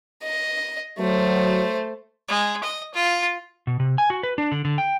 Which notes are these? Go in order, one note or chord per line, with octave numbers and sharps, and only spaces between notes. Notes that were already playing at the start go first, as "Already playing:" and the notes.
D#5
F#3 A3 C5
G#3
D#5
F4
B2
C3
G#5
F#4
B4
D4
D3
D3
G5